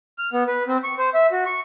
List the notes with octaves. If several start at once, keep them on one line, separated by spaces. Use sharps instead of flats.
F6
B3
B4
C4
C#6
C5
E5
F#4
C#6